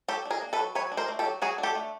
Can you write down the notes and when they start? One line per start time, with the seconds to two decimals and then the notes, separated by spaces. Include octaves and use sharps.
0.08 F#3 G4 A4
0.25 D4
0.31 G#4 A#4
0.41 A#3
0.53 A4 B4
0.59 F#3
0.75 F#3 B4 C#5
0.92 D4
0.97 A#4 C5
1.08 A3
1.19 G4 A4
1.25 F#3
1.42 F#3 F#4 G#4
1.58 D4
1.63 G4 A4
1.75 A3